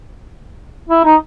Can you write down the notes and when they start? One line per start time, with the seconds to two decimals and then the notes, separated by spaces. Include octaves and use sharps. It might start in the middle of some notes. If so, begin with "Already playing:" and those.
0.89 E4
1.05 D#4